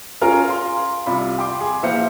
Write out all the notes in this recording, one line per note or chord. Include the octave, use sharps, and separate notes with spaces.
C#4 F4 G#4 A#4 F5
F5 C6
C2 C3 F4 B5
G5 C6 D6
G#4
A#1 E4 B4 C5 F5 C#7